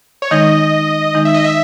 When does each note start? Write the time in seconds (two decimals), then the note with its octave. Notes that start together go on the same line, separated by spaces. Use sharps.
0.22 C#5
0.31 D#3 G#3 D#4 D#5
1.15 D#3 G#3 D#4
1.25 E5
1.34 D#5
1.44 E5